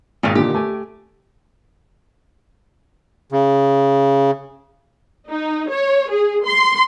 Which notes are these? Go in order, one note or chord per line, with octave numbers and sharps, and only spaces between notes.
G#1 A#2 D#3
A#2 D3 D#3 G4
A3 G#5
C#3
D#4
C#5
G#4
C6